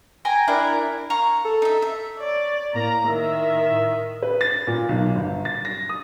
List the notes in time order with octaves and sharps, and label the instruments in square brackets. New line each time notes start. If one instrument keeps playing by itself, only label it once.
[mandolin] G5 G#5 A#5
D4 E4 A#4
[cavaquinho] F5 A#5 C#6
[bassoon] A4
[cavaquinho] D#4 E5
E5
[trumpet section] C#5 [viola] D5
[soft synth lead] A2 [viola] A#3 [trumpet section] A#5
[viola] D#3 [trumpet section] E5
[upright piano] B4
A6
A#2
B1
G1
A6
A#6
D#6